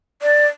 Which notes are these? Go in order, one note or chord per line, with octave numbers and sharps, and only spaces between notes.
D5